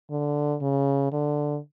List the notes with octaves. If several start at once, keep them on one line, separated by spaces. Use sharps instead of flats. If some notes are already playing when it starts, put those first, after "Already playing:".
D3
C#3
D3